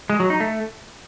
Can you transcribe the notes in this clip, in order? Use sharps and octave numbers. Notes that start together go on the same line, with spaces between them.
G#3
F#3
D#4
A3